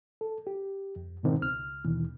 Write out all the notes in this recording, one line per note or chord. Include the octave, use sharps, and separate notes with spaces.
A4
G4
F2
G#2 B2 D#3 C4
C#2 F6
D#2 B2 D#3 E3